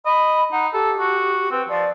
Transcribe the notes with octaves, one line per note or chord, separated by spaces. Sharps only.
D#5 B5
D#4 F#5
G4 A4
F#4
C4 B4
F3 D5